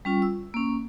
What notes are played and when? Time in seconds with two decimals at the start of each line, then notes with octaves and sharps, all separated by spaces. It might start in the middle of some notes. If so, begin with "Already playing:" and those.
0.05 G3 C#4 F4
0.22 E6
0.54 A#3 C#4